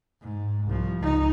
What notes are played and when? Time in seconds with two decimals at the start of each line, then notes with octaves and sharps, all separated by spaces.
0.21 G#2
0.66 C2 F3
1.00 C#2 D#4